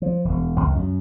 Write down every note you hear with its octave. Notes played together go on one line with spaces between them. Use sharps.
F3
E1
C#2
F#2